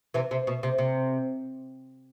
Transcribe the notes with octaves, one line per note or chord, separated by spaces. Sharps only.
C3 E3
C3
B2
C3
C3